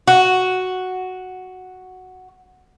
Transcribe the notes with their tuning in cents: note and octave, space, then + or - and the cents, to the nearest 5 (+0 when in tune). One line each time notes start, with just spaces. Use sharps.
F#4 +0